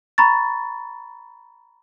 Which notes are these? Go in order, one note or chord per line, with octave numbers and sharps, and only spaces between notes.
A#5 B5 C#6 A6